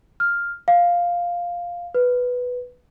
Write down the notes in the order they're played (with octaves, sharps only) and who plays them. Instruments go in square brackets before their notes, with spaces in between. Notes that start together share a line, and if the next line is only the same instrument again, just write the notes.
[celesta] F6
F5
B4